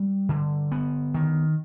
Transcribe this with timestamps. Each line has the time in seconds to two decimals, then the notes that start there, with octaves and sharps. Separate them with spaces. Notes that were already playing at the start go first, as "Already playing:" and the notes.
Already playing: G3
0.29 D3
0.72 B3
1.14 D#3